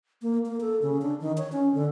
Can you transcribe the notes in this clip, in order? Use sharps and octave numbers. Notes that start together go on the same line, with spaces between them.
A#3
A#3
A4
C#3
D4
D#3
C#5
C#4
D3